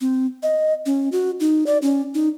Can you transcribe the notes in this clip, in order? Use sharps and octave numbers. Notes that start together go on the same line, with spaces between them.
C4
D#5
C#4
F#4
D#4
D5
C#4
D#4